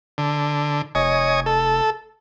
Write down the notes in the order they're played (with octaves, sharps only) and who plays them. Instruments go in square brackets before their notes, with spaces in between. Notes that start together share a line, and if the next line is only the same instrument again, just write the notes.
[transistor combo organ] D3
[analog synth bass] F1 [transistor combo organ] C#5 D#5 G#5
[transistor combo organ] A4